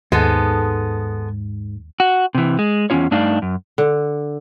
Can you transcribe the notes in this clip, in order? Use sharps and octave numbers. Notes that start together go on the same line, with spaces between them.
D#2 G#2 G#3 B3 A4
F#4
C3 E3
G#3
E2 G2 C#4 F4 C#5
G2 A3 D4 D#4 D5 F5
F#2
D3